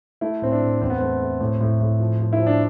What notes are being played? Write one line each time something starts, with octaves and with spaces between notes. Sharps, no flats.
A3 E4
A2 C4
D4
A2
E2 C4
B3
A3 C4
A3
A2
A2
A2
F3
F3
E4
F3
D4